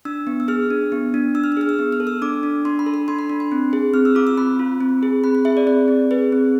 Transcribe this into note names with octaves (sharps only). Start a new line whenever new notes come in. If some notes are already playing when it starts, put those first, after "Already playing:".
D4 E6
B3
E6
G#4 F6
D4
B3
D4
D4 E6
F6
E6
G#4 F6
E6
B3
F6
A4
E6
D4 D6
D4
D4 C6
B5
A4
B5
D4 C6
B5
D4
C6
C4
G#4
C4 F6
E6
F4 D6
E6
C4 B5
F4
C4
G#4
C4 B5
B5
G#4 E5
D5
C4 D5
C4
G#4 B4
C4